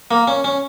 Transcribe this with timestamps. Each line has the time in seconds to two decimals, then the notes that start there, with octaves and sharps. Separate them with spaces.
0.11 A#3
0.28 C#4
0.44 C#4